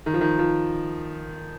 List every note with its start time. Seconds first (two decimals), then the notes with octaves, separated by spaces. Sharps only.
0.06 D#3
0.14 F3
0.21 D#3
0.39 F3